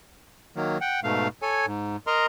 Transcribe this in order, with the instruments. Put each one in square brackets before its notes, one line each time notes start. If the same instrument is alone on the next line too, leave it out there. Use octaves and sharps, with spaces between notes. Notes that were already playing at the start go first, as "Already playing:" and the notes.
[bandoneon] D#3 F#3 A#3
F#5 G5
G#2 B2 A3 F5
A4 C#5 G#5
G#2
A#4 D#5 A#5 C6